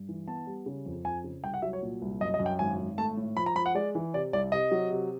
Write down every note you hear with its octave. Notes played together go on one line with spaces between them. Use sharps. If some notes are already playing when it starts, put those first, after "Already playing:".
Already playing: G2
E3
B3 A5
G3
C#3
F2
F2 G#5
C#3
C2 G5
F#5
F#3 E5
C#5
A#2
C2
F#2 D#5
D#5
F#2
G5
G#1 G#5
G#1
A3 A5
A2
F3 B5
A#5
F3 B5
F#5
G#3 D5
E3
C3 D5
C2 D5
C3 D#5
F#3
C3